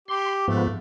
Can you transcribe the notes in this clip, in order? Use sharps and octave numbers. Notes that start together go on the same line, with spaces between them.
G4 C6
G#2 F3 A3 B3